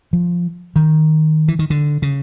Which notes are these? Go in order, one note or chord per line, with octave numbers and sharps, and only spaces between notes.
F3
D#3
E3
D#3
D3
C#3